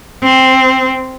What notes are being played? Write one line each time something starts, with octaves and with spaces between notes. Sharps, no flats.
C4